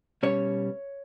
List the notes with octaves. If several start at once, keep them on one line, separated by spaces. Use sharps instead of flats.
B2 G3 C#4 C#5